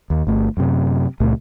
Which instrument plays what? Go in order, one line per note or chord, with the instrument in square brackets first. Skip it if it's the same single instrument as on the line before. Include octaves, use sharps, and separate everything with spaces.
[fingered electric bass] D#2
G1 A3
F#2 C3
C#2 A#2 A3